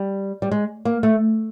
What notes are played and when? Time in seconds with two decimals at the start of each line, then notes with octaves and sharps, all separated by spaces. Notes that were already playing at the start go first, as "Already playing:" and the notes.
Already playing: G3
0.42 G3
0.51 G#3
0.85 A#3
1.03 A3